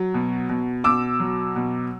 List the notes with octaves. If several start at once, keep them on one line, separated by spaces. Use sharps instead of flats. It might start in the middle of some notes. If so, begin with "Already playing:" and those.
Already playing: F#3
B2
B2
B2 D6 E6
F#3
B2